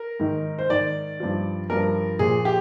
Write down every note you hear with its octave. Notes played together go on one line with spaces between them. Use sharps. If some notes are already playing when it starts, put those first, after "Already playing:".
Already playing: A#4
G#2 D#3
C5
G#2 D#3 D5
G2 F3
G2 F3 A#4
A#2 F3 G#4
G4